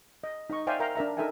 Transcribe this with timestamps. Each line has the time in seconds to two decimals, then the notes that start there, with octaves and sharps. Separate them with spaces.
0.24 D#5
0.50 D#4 D#5 C#6
0.67 C5 D5 E5 F5 G5 G#5
0.80 A#4 E5 F5 G5 A#5
0.96 D4 A#4 E5 A#5
1.17 D#4 A4 A#4 E5 G5 G#5